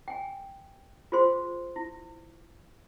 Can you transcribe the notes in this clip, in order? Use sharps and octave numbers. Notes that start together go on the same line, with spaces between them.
G5 G#5
F4 G#4 C5 C6
E4